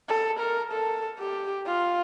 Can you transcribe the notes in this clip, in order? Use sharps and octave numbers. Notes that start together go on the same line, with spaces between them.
A4
A#4
A4
G4
F4